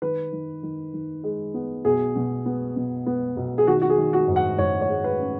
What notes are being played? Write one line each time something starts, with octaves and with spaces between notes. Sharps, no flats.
D#3 B4
D#3
D#3
D#3
G#3
B3
B1 G#4
B2
B3
B2
B3
B1
G#4
D#3 F#4
F#4
G#4
D#3
F#4
G#2
F#5
G#2 C#5
C#5
G#3
B4
C#4